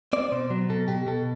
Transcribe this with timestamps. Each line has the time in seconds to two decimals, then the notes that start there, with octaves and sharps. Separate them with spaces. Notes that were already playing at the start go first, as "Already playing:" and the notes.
0.13 C4 D5
0.32 B2 C5
0.50 F#3
0.69 B2 A4
0.88 B2 G4
1.07 B2 A4